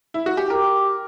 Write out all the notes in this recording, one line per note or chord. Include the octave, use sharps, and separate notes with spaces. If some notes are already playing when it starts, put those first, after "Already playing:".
E4
F#4
G4
G4 A#4